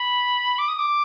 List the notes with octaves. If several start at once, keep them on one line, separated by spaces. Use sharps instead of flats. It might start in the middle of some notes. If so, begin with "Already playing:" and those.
Already playing: B5
D6
D#6
D6